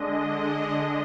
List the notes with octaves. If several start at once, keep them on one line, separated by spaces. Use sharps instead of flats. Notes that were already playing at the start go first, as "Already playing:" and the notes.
Already playing: D3 G#3 D4 D#5